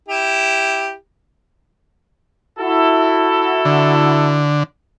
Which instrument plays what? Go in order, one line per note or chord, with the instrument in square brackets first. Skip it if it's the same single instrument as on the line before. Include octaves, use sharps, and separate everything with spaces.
[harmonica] E4 G4
[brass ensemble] E4 F#4 A4
[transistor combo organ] D3